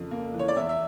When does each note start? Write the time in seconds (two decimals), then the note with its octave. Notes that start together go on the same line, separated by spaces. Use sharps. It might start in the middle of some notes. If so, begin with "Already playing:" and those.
Already playing: F2 C#3 A3
0.11 A#3
0.34 E3
0.39 C#5
0.48 D5
0.56 E2 E4 E5
0.69 E5